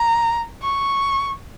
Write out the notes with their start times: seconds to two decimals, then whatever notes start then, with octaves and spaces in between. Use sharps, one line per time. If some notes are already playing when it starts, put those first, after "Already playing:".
Already playing: A#5
0.62 C#6